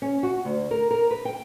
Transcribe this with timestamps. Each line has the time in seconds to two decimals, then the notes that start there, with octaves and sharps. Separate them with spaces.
0.02 C#4
0.23 F#4
0.45 D2
0.71 A#4
0.91 A#4
1.11 B4
1.25 G5